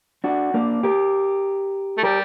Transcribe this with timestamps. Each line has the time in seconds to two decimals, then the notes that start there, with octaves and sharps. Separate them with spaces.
0.24 D4 F#4
0.54 A#3 D4
0.83 G4 A#4
1.98 A3
2.03 G3 G4 A#4